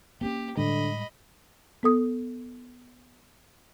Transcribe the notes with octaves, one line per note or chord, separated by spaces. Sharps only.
A#3 C4 C#4 G4
A2 D3 G3 G#3 D#5 B5
B3 A4 D#6